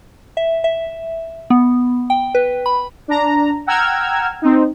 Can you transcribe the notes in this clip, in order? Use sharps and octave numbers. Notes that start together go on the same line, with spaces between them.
E5
E5
B3
G5
B4
B5
D4 A#5
F#5 G5 A#5 E6 F6 G#6
C4 D#4